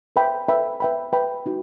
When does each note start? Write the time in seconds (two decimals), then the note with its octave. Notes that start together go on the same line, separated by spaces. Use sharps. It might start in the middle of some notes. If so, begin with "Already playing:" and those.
0.16 B4 E5 G5 B5
0.48 B4 E5 G5 B5
0.80 B4 E5 G5 B5
1.13 B4 E5 G5 B5
1.46 D#4 F#4